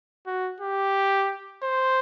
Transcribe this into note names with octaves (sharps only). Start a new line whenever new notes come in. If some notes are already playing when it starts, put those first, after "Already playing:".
F#4
G4
C5